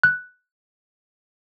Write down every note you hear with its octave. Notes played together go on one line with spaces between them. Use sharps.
F#6